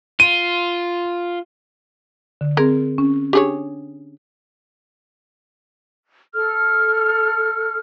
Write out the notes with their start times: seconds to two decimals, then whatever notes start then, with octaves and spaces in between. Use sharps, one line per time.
0.20 F4 D#7
2.41 D3
2.57 C4 G#4 A#4
2.98 C#4
3.33 D4 G4 G#4 C#5
6.34 A4 F6